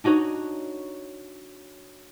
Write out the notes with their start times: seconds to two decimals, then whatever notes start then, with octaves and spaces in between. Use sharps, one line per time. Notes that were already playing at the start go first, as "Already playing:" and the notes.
0.04 D4 D#4 F#4 C#5 D#5